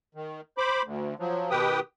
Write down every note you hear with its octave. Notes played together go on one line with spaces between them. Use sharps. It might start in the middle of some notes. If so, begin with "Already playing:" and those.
D#3
C5 B5 D6
D2
F3 F#3
B2 D#3 G4 B4 G5 D#6